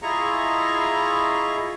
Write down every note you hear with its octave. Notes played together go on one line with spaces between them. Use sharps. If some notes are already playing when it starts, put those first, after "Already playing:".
E4 F4 G#4 D#5 A#5 C#6